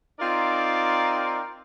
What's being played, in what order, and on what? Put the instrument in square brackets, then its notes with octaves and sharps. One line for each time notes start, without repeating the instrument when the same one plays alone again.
[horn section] C4 D#4 F4 A#4 D5